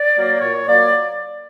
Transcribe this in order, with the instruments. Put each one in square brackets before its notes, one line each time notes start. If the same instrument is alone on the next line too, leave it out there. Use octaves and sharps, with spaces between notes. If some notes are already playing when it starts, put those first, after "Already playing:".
Already playing: [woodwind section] D5
F#3 A#3
A#2 C#5
F#3 A#3 D5